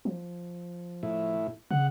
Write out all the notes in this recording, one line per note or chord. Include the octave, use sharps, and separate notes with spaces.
F3
A2 E4
C#3 F#5